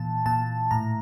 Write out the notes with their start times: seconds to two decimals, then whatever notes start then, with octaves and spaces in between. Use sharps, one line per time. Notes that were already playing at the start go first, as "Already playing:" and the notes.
Already playing: A#2 E3 A5
0.26 A#2 A5
0.71 A2 A#5